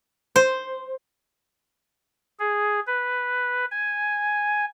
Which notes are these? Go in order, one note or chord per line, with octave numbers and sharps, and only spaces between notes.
C5
G#4
B4
G#5